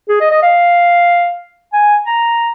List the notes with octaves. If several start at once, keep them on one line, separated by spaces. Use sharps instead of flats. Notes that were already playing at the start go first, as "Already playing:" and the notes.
G#4
D#5
D#5
F5
G#5
A#5